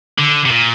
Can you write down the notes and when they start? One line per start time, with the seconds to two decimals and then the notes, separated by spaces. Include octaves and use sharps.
0.18 D3
0.46 C3
0.51 A#2